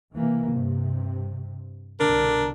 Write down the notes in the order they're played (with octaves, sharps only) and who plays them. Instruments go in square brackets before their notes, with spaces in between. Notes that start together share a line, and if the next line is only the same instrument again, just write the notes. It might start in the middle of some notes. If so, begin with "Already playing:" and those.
[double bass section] C3 E3 A#3
G2 C3
[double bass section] C2 B2 D3 [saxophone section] D4 A#4